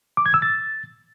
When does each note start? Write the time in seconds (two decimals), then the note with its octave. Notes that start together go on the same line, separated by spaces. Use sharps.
0.17 D6
0.26 G#6
0.34 E6
0.42 A6